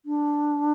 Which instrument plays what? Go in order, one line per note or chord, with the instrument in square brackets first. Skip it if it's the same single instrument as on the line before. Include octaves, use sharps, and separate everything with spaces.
[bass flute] D4